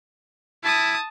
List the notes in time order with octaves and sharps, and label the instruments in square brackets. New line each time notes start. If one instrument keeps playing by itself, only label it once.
[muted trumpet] E4 [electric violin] A5 D#6